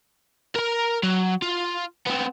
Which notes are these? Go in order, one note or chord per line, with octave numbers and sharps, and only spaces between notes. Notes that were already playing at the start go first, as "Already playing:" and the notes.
A#4 A#5
F#3
F4
B3 C4